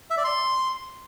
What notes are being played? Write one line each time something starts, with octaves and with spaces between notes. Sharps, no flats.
E5
D5
C6